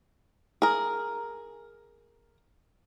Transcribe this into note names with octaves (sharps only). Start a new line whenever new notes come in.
G#4 A#4